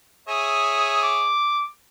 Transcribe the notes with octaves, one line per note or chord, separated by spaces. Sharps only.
G#4 C#5 E5 D#6
D6